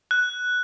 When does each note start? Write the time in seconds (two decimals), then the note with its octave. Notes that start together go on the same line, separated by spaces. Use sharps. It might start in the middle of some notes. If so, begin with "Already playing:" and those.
0.11 F#6